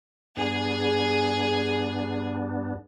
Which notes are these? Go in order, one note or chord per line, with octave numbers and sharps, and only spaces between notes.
G2 B3 D4 G#4